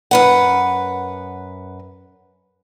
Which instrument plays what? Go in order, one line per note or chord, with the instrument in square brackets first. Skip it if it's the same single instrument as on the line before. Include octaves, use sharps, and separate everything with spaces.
[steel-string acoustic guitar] F#2 B4 F#5